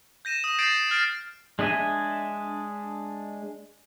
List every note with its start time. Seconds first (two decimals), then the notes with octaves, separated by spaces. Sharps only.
0.25 G6 A#6 D#7 E7
0.44 D#6
0.59 G6 A6 C7 D7 E7
0.91 F6 A6 D7
1.59 G#3 D4 D#5 E5 G#5